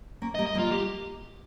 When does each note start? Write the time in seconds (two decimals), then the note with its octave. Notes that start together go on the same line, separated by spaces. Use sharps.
0.22 A#3 C#4
0.35 D#5
0.38 G3 A#3
0.47 D#5
0.55 G3 A#3 F4
0.71 G4